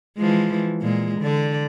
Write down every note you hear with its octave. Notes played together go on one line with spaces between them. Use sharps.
E3 F3 G#3
A#2 G#3
D3 D5